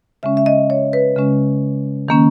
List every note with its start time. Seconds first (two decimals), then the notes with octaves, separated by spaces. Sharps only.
0.23 C#3 G#3 C#4 E5
0.37 E5
0.46 D#5
0.70 C#5
0.93 B4
1.16 C#3 G#3 C#4
2.08 D#3 A#3 C#4